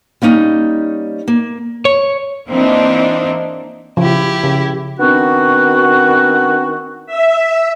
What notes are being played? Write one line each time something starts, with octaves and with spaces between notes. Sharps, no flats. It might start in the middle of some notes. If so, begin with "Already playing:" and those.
G3 A#3 C#4 D#4
A#3
C#5
E3 A#3 C4 D4 D#4
C#3 F3 E4 G4
C#3
D#3 B3 C4 D4 F#4
E5